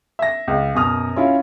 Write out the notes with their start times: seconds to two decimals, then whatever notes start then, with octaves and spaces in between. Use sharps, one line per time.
0.19 E5 A#6
0.48 C#2
0.75 F#2 B2 D#6 F6
1.16 C#4 E4 F4